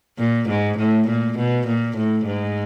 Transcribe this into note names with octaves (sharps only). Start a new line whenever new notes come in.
A#2
G#2
A2
A#2
B2
A#2
A2
G#2